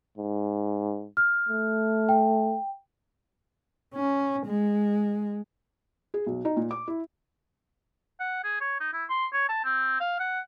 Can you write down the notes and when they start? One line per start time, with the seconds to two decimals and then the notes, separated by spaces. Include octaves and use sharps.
0.18 G#2
1.17 F6
1.49 A3
2.09 G5
3.94 C#4
4.46 G#3
6.14 G#4
6.26 B1
6.45 D#4
6.57 A#2
6.71 D6
6.88 E4
8.20 F#5
8.44 G#4
8.61 C#5
8.80 D#4
8.93 E4
9.10 C6
9.33 C#5
9.49 A5
9.65 C4
10.00 F5
10.20 F#5